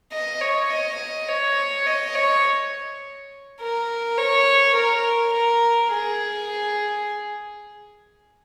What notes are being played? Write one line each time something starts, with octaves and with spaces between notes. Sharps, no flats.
D#5
C#5
D#5
C#5
D#5
C#5
A#4
C#5
A#4
A#4
G#4